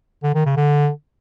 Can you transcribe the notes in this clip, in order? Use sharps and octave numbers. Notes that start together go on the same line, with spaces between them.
D3
D#3
C#3
D3